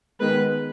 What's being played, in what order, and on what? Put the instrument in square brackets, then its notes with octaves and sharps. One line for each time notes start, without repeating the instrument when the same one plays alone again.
[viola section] D#3 G#3 B3 B4